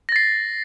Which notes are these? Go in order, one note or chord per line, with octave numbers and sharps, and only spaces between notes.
A6 A#6 C7